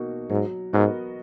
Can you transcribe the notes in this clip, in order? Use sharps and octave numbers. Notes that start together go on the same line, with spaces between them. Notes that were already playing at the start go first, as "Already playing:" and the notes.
Already playing: B2 A#3 D#4 F#4
G#2 F#3
G#2 B3 F#4 A#4 D#5